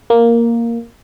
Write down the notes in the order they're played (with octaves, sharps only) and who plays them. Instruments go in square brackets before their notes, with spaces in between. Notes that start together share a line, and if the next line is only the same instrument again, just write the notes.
[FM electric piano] A#3